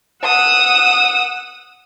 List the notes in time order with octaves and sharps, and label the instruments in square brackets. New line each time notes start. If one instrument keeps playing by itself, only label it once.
[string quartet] F#5 D#6 E6